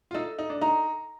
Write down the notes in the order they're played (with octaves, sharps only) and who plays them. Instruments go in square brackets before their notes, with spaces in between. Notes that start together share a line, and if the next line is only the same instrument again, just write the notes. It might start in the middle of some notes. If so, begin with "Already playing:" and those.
[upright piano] F4
[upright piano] D#4 [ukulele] A4
[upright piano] D#4
D4
[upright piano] D#4 [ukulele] A#5